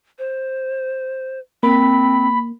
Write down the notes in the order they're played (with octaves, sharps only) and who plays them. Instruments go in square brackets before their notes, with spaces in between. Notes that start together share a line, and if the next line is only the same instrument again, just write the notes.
[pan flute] C5
[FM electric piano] A#3 [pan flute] C4 [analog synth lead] B5